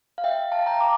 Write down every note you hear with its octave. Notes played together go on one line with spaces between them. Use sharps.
F5
E5 G5
F5 A5
A5
G5 A#5
A#5 D6